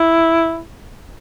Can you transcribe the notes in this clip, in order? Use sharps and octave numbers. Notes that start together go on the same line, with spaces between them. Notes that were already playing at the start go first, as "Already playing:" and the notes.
Already playing: E4